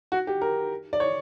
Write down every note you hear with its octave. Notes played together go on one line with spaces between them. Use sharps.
F#4
G4
A#4
D5
C#5